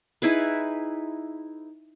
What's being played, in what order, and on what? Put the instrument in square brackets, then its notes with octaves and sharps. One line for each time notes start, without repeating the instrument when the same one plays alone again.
[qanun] D#4 E4 G#4 B4